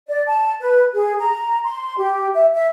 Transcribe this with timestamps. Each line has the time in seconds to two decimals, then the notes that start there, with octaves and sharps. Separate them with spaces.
0.07 D5
0.27 A5
0.59 B4
0.94 G#4
1.19 A#5
1.64 C6
1.97 G4
2.33 E5
2.53 E5